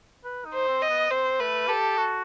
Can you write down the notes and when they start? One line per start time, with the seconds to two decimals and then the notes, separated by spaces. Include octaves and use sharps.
0.24 B4
0.45 D#4
0.54 C5
0.68 C4
0.82 D#5
0.90 B3
1.11 C4 C5
1.40 A3 B4
1.68 G4 A4
1.97 F#4